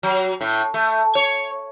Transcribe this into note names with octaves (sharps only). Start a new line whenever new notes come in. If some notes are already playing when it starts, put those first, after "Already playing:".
F#3
A2
A3
C#5